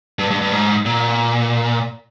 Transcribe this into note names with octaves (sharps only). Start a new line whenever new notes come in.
G2
G2
G2
G#2
A#2